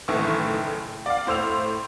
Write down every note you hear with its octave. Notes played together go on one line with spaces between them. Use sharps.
F#1 A2 D#3 E3 E5 C#6
D5 F5
A2 C5 E6 F7